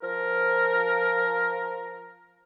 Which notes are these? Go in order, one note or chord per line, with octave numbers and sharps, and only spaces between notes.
F3 A#4